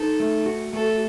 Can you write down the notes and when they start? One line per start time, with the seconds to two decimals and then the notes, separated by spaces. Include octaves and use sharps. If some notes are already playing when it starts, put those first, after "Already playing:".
Already playing: D#4 A4
0.20 A3
0.46 F#4
0.73 A3 A4